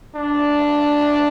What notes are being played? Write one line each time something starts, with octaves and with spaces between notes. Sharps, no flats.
D4